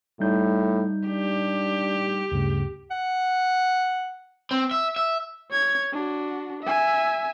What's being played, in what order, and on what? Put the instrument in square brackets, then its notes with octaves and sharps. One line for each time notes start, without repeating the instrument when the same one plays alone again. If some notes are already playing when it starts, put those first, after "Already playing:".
[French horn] A2 [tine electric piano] G3 D#4 G6
[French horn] D4 [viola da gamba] G4
[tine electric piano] D2 G2 C#3
[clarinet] F#5
[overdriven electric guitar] C4
E5
E5
[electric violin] C#5 G#6
D4 F#4
E5 G#5